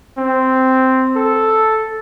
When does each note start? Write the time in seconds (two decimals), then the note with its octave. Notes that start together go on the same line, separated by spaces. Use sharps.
0.18 C4
1.16 A4